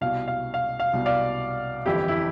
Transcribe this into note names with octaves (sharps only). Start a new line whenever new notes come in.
C2 B2 F5
F5
F5
F5
C2 B2
D5 F5
G1 F2 E3 E4 G4
E4